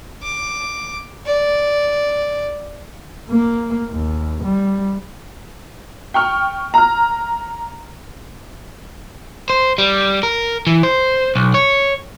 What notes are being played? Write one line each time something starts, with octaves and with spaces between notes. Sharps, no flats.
D6
D5
A#3
D#2
G3
G5 C#6 F6
A#5 F6
C5
G3
A#4
E3
C5
B1
C#5